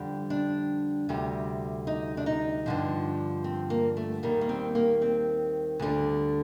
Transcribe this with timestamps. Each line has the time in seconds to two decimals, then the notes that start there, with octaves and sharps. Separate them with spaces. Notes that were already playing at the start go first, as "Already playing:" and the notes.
Already playing: F2 D3 G3
0.30 D4
1.09 D2 C3 G3
1.87 D#4
2.17 D4
2.26 D#4
2.66 G2 D3 F3
3.44 C4
3.70 A#3
3.97 A3
4.23 D#2 D#3 G3 A#3
4.41 A#3
4.49 C4
4.75 A#3
5.02 C4
5.79 D2 D3 G3